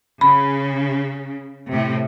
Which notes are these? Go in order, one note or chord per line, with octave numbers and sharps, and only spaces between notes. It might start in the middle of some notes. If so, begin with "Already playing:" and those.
C#3 B5
A2 C3